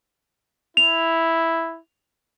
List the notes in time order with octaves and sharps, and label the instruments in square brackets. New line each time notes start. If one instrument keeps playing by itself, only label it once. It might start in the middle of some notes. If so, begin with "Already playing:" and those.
[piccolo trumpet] E4 [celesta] F7